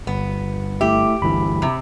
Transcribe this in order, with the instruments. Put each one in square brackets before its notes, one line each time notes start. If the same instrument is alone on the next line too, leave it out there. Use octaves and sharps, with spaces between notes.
[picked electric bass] G1 [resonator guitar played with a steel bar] B3
[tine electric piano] A3 E4 E5 [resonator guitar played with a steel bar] G4
[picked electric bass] G1 D2 E3 [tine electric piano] B5
[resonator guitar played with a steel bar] C3